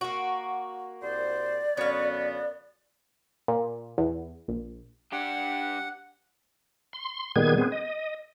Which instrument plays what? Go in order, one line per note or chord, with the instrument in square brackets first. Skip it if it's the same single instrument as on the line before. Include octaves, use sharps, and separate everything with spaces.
[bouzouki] A#3 F#4
[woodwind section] C2 C5 [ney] D5
[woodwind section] F#2 D3 B3 [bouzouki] C#5 F5
[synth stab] A#2
E2
A#1
[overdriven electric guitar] D4 G4 [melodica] F#5
[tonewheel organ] C6
A#2 D#3 G3 B3 G#4 G#6
B3 C4 G#4
D#5